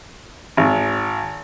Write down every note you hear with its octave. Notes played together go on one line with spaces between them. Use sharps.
G#1